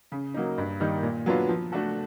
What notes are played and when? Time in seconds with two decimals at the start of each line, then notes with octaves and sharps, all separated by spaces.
0.12 C#3
0.34 F#3 A#3 D#4
0.58 G2
0.80 D#3 G3 A#3 D#4
1.03 A#2
1.26 F#3 B3 D4 F4
1.49 F3
1.72 A3 D4 F#4 A4